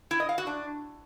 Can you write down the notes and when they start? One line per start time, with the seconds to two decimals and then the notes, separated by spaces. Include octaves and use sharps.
0.11 E4
0.20 D#5
0.29 F5
0.38 F#4
0.47 D4